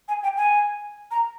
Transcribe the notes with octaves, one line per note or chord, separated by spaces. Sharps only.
G#5
G5
G#5
A#5